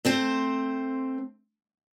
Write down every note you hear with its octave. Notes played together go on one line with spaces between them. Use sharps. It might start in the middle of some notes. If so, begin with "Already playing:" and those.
A3 C4 C5